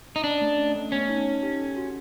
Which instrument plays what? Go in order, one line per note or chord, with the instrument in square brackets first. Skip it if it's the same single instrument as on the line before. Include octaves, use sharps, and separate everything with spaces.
[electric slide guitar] D#4
[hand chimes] C#4 [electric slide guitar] D4
[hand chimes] A3
C#4
A3
[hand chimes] B3 [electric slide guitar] C#4
[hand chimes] D#4
D#4
G4
A4
F#4